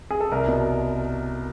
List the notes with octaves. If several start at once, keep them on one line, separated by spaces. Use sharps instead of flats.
G#4
A4
C2 A#4
B2